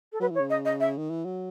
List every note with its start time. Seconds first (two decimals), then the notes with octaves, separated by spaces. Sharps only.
0.13 A4
0.20 F#3 B4
0.30 E3 C#5
0.40 C#3
0.50 D#5
0.65 D#5
0.80 E5
0.98 D#3
1.10 E3
1.25 F#3